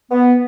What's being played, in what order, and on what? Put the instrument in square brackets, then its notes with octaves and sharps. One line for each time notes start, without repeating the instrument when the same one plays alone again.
[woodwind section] B3